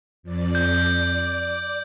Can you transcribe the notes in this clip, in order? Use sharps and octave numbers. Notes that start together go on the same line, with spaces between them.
F2 D5
G6
D5